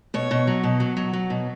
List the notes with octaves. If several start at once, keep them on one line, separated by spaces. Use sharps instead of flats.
B2 C#5
B2
F#3
B2
F#3
F#3
F#3
B2